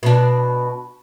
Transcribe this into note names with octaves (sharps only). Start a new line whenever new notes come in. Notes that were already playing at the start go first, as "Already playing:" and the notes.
B2 D4